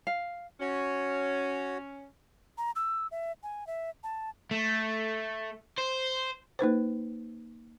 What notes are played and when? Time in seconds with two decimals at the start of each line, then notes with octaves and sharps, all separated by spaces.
0.07 F5
0.60 C#4 F#4 C#5
2.58 A#5
2.76 E6
3.11 E5
3.43 G#5
3.67 E5
4.04 A5
4.51 A3
5.78 C5
6.59 A#3 D#4 B4 C5